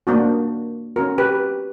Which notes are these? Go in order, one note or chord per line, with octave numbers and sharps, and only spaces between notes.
A#3 D4 F#4
C#4 F#4 A#4
G4 B4